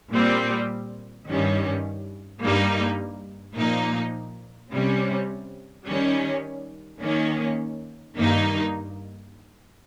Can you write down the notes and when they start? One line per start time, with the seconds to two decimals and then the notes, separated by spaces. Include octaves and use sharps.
0.12 A#2 G3 C4
1.27 G2 D#3 G3 C#4
2.42 G2 G3 A#3 D#4
3.57 A#2 F3 A#3 D#4
4.72 C3 G3 C#4
5.87 D#3 G3 C#4
7.02 D#3 A#3 C#4
8.17 G2 D#3 A#3 D#4